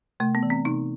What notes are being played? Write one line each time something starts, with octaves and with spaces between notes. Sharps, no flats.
C3 A3
B3
E3
C4
C3 D#4